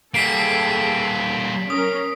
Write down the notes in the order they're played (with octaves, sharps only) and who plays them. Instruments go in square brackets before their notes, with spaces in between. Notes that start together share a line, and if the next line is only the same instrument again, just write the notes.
[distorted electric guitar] G3 A#3 [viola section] G#4 A4 [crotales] B6 C7 D7
[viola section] C#4 A#4 [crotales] D#6